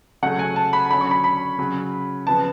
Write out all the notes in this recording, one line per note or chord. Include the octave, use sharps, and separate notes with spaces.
C#3 F#3 A3 C#4 F#5
G#5
A5
B5
D3 F#3 C#4 B5
C#6
B5
B5
C#3 F#3 C#4
C#3 F3 B3 A5